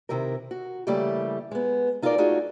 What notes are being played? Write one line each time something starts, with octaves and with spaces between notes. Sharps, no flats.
C3 D#3 E4 G4 A#4
F#4
C#3 E3 G3 A3 A#3 G4
G#3 B3
D#4 F4 F#4 G#4 A#4 D5
A3 D#4 F4 F#4 G#4